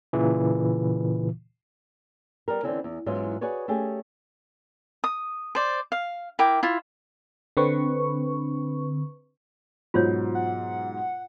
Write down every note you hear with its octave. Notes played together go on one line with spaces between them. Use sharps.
A#2 C#3 E3
G3 B3 A#4
D3 E3 F3 C4 C#4 E4
E2
G#2 E3 F#3 B3 C#4 F4
F#4 G#4 B4 C#5 D5
A3 C#4 G4 G#4
D#6
C5 D5
F5
E4 A#4 G5 D6
E4 F4
D3 C4 B4 C#6
G#2 B2 F#3 F4 C5 C#5
F#5